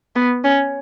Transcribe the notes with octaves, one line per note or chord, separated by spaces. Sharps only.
B3
C#4